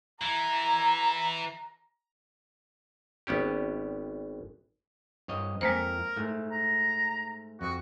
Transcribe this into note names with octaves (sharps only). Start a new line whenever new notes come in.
E3 A#5
G#1 B3 C#4 G4
G2 C#5 D#5
F2 G#3 A#3 A#4 C5
G#2 A3
A#5
F2 F#4